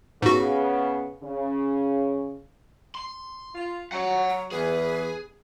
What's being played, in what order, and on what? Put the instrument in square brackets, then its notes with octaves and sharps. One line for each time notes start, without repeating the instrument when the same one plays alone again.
[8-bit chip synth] G#2 F#4 [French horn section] C#3 B3
[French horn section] C#3
[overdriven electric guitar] C6
[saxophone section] F4
[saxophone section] F#3 [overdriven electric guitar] F#5 A#5
[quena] A#5
[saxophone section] E2 [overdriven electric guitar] G#4 [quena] B4